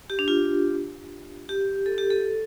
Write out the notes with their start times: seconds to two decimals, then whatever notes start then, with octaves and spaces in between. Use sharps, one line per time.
0.10 G4
0.19 D4
0.28 F4
1.49 G4
1.86 A4
1.98 G4
2.10 A4